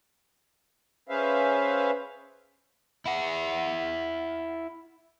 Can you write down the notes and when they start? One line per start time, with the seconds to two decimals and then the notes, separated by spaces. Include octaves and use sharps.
1.09 C#4 G#4 B4 C5 E5 F5
3.05 E4 F#5